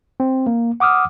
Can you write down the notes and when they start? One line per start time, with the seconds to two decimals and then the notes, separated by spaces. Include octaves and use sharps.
0.20 C4
0.47 A#3
0.80 F#5 D6 D#6 F6